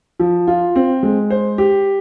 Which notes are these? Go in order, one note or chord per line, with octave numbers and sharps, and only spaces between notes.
F3
F4
C4
G#3
C5
G4